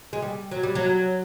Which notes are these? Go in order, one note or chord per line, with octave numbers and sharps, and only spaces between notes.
G#3
G3
F#3
G3
F#3